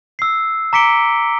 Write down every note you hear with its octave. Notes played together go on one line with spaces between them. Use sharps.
E6 C7
A#5 D6 B6 C#7 D7 G7